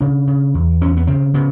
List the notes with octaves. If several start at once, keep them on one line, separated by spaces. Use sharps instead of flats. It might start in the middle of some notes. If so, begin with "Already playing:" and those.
C#3 D4
C#3
E2
E2 C#4
B3
C#3 C4
C#3 B3